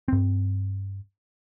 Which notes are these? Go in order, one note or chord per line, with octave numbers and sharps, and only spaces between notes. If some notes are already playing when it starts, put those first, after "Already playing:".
G2 C4